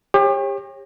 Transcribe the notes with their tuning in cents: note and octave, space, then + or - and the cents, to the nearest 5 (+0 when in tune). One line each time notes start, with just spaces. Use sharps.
G4 +35 C#5 -30